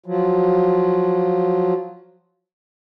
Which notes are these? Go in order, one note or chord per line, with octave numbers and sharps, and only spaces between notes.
F3 F#3